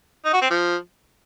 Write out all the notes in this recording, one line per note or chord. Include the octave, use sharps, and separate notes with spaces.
D#4
F#4
C4
F3